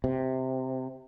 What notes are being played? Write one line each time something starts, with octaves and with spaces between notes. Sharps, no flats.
C3